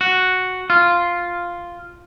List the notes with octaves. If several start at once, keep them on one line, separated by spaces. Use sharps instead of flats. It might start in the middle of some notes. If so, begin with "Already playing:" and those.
F#4
F4